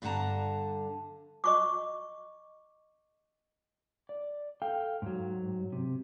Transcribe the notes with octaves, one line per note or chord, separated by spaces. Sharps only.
G2 D3 D4 F#5 A5 A#5
D#5 C#6 D6
D5
A4 F5 G5
G#2 F#3
C3